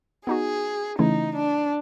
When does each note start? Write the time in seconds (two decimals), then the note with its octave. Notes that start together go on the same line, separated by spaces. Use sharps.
0.27 B3 D#4 F#4 G#4
0.99 C#3 E3 A3 C#4 D#4 E4
1.35 D4